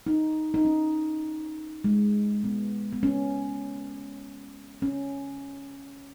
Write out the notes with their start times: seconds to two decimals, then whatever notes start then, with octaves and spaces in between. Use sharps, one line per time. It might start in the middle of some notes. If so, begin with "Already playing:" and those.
0.07 D#4
0.54 D#4
0.65 C#4
1.84 G#3
2.44 B3
2.93 B3
3.03 C#4
4.82 C#4